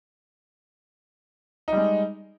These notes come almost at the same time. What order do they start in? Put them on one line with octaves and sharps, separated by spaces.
D#4 G3 G#3